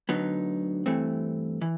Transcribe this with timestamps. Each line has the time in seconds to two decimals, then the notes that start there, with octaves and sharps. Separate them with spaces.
0.09 D2 D3 F#3 B3 D#4
0.86 G2 E3 A3 C4
1.61 E3